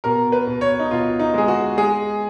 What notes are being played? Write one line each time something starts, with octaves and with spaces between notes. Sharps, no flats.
B2 A#4
B4
B2
C#5
D#4
B2 F4
D#4
G#3 G#4
F#4
G#3 G#4